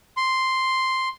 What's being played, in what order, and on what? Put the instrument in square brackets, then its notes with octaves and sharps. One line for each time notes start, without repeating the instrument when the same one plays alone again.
[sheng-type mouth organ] C6